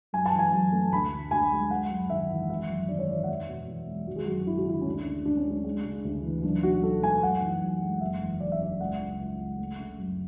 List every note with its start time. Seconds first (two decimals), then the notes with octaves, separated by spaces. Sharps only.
0.13 F#2 G#5
0.26 A5
0.32 E3
0.39 G#5
0.53 F#2
0.72 A3
0.92 D2 B5
1.11 D3
1.31 D2 G#5
1.52 G#3
1.71 G#3 F#5
1.90 F#2
2.10 G#1 E5
2.30 E3
2.50 G#1 E5
2.69 F#2
2.89 G#1 D5
2.99 C#5
3.08 E3 D5
3.24 F#5
3.28 E2 E5
3.49 B2
3.68 E2
3.87 G#3
4.07 G#1 F#4
4.16 G#4
4.25 F#2 F#4
4.47 G#1 E4
4.58 F#4
4.66 D3 E4
4.82 C#4
4.85 D2 D4
5.05 D3
5.25 D2 D4
5.37 C#4
5.45 G#3
5.50 D4
5.64 G#3
5.85 C#3
6.05 D2
6.23 E3
6.43 B1 D4
6.63 B2 F#4
6.82 B1 A4
7.03 A3 G#5
7.23 F#2 F#5
7.42 E3
7.62 F#2
7.82 G#3
8.01 F#1 E5
8.21 E2
8.40 F#1 D5
8.52 E5
8.60 C#3 D5
8.80 C#2 F#5
9.00 C#3
9.19 C#2
9.39 G#3
9.58 A3
9.79 C#3
9.98 F#2